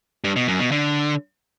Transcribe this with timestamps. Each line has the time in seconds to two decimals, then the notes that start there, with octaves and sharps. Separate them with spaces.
0.24 G2
0.36 B2
0.48 F#2
0.60 B2
0.72 D3